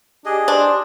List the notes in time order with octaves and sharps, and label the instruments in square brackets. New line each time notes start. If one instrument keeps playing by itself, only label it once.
[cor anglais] D4 [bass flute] G4 [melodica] G#4 D#5
[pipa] D4 [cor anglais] C5